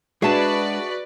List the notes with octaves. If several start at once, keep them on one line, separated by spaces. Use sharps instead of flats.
G#3 D4 F#4 G#4 B4 D5 E5 A5